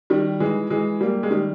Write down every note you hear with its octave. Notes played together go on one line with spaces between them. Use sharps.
D#3 G3
E3 G#3
E3 G#3
G3 A#3
G#3
D#3 G3